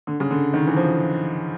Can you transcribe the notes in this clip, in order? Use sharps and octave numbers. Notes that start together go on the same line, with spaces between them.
D3
C#3
D3
D#3
E3
F3